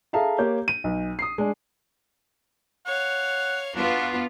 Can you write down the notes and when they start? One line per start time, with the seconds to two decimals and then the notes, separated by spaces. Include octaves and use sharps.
0.13 G#4 A4 E5 F5 A5 A#5
0.39 A#3 G4 C#5 G6
0.68 D#7
0.84 B1
1.19 D#6 C7
1.38 G#3 D4
2.86 C#5 F5 F#5
3.75 B3 D4 F4 F#4